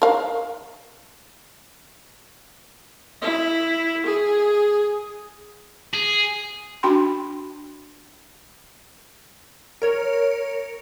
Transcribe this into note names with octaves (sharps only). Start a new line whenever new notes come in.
A#4 F5
E4
G#4
G#4
D4 F#4 G5 B5 C6
A#4 C#5